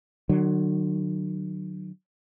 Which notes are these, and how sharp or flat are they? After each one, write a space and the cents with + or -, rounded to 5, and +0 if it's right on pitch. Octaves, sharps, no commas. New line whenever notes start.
D3 +45 F#3 +0